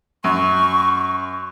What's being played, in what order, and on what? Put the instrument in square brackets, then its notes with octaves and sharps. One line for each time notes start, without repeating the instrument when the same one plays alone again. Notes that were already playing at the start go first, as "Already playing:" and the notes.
[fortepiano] F#2 [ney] C#6